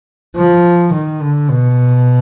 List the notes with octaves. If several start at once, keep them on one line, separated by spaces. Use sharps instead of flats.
F3
D#3
D3
B2